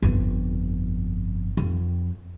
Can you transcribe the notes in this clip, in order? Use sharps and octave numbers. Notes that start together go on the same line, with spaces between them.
G1 F2
F2